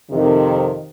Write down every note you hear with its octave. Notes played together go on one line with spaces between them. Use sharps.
F2 C3 D#3